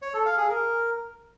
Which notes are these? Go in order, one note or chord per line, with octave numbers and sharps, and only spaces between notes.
C#5
A4
F5
G#4
A#4